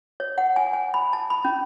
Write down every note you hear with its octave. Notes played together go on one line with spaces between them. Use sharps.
C#5
F#5
G#5
G#5
B5
A5
B5
C#4